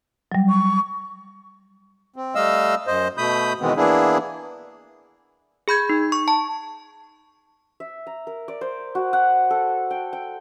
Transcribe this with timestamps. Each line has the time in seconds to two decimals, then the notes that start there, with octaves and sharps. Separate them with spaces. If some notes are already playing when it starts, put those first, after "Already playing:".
0.32 F#3 G3
0.49 C#6
2.16 C4
2.35 G3 A3 D#5 F5 E6
2.87 F#2 C5 D#5
3.18 B2 A3 B5 D#6 G6
3.61 B2 D#3 E3 G#3 B3 C4
3.77 E3 A#3 B3 D4 E4 G#4
5.68 G#4 B5 G6 G#6
5.89 D#4
6.12 C#6
6.28 A5
7.80 E5
8.07 A#5
8.27 A#4
8.48 D5
8.61 C5
8.95 F#4
9.13 F#5
9.51 A4
9.91 G5
10.13 G5